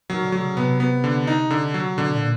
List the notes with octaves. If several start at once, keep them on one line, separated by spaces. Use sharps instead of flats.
D#3 F#3
D3
F#3
C#3
C3 B3
B3
D3
D#4
D3
F#3
B2 D3
A#2